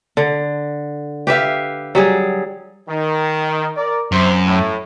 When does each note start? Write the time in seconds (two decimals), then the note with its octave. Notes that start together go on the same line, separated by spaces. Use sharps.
0.17 D3
1.27 G4 B4 E5 F5
1.95 F#3 G3 G#4
2.88 D#3
3.75 A#4 D5
4.12 F#2 C3 C5
4.46 A2